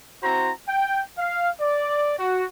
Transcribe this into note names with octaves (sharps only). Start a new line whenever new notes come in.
C4 E4 F#4 C5 A#5
G5
F5
D5
F#4